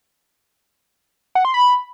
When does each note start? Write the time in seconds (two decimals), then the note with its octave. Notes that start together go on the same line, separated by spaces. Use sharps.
1.35 F#5
1.45 C6
1.54 B5